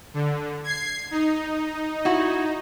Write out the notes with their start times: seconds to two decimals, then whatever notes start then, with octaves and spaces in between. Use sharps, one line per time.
0.14 D3
0.64 G#6 C7
1.11 D#4
2.05 E4 F#4